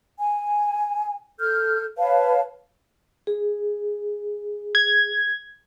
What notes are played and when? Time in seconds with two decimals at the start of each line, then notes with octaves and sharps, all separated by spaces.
0.17 G#5
1.39 A4 F6 G6
1.98 B4 C#5 F5 A5
3.27 G#4
4.75 G#6